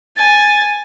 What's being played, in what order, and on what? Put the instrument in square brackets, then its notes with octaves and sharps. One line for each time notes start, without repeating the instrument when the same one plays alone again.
[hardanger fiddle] G#5 [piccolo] A6